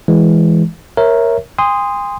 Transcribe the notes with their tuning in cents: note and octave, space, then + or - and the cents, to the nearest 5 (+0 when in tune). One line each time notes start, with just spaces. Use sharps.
E3 +0 G#3 +0
A#4 +0 C#5 -20 E5 +0
G#5 -45 C6 -10 D#6 +0